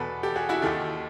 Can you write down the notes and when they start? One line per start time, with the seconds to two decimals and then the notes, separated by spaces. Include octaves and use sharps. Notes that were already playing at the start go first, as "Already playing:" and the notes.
Already playing: E2 B2 A4 B4
0.23 G4 A4
0.36 F#4 G#4
0.49 E4 F#4
0.62 D#2 D#3 G4 A4